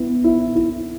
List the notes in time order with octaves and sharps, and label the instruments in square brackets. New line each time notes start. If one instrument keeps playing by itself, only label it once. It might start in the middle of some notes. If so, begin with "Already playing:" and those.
Already playing: [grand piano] B3 E4
E4
E4